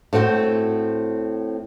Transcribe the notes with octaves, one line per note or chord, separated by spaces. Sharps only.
A2 C4 F#4 C5